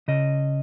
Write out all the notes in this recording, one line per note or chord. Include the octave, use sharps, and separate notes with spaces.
C#3 D#5